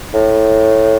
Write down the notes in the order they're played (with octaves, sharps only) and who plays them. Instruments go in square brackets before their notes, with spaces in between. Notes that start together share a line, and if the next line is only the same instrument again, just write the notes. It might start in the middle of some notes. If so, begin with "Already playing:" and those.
[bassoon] A2